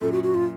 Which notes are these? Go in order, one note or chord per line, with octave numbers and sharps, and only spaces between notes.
F#2 A#2 A4
F#4
F#4
A#2 F4